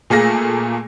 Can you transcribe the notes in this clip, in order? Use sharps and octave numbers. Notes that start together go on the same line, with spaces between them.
A#2 A3 A#3 G#4 A#6